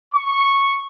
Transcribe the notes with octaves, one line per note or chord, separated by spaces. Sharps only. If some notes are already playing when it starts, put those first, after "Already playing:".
C#6